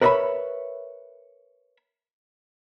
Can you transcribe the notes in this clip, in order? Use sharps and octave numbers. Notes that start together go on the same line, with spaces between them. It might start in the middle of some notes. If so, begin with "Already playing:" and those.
A#4 B4 C#5 D#5 E5 B5